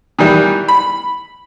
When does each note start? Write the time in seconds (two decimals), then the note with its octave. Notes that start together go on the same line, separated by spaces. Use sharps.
0.19 D#3 E3 G3
0.68 B5